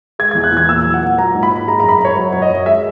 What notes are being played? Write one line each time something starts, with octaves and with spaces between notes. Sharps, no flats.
G#3 G#6
G#6
E2
F#6
E2 G#6
A#2 E6
F#3
F#5
A#2
F#3 A#5
G#2
B5
G#2
G#3 A#5
A#5
F#2
B5
A#5
F#2 C#5
F#3
F#2 C#5
D#5
F#2
G#3 E5